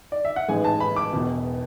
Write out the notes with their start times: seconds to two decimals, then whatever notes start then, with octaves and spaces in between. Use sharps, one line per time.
0.12 D5
0.25 E5
0.36 F#5
0.48 A1 G#2 E3 G#3 G#5
0.65 A5
0.80 B5
0.96 D6
1.13 E1 E2 B2